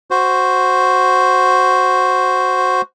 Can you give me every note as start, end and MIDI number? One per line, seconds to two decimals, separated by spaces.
0.11 2.81 66
0.11 2.81 72